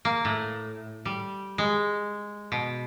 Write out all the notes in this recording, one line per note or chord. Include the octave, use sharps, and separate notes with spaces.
A#3
A2
G3
G#3
B2